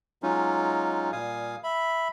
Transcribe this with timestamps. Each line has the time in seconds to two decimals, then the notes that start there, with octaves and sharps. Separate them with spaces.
0.23 F#3 G#3 C#4 D#4 F4
1.12 A#2 G3 F5 G#5 D#6
1.64 E5 B5